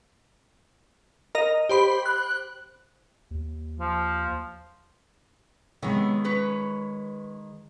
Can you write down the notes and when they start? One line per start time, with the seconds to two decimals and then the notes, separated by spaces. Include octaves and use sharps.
1.35 A#4 D#5
1.69 G4 C5 B5
2.06 F#6
3.31 D#2
3.80 F3
5.82 C3 D#3 G#3 B3 C#5
6.24 C#4 B4 C#5